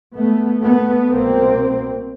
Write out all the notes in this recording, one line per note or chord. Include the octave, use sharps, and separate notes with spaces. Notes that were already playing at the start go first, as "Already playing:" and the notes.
A3 B3
A3 B3
C2 B2 A#3 C4